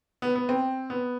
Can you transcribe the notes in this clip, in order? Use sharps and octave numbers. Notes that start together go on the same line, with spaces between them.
B3
B3
C4
B3